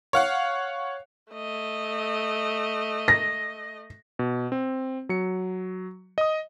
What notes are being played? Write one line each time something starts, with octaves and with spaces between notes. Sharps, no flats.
C#5 F5 F#5
A3 D#5
A#6
B2
C4
F#3 C#7
D#5 D#6